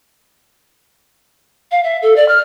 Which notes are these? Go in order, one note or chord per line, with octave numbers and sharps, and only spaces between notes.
F5
E5
A4
D5
F6